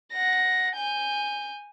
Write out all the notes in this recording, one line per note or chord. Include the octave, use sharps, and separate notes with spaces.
F#5 A#6
G#5 G6